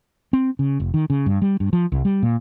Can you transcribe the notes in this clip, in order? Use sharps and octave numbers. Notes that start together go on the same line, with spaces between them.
C4
C#3
F1
D#3
C#3
G2
G3
G2
F3
C2
G3
A#2